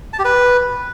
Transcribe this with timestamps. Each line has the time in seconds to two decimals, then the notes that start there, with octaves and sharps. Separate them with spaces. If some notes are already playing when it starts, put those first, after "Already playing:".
0.13 A5
0.19 G4
0.25 B4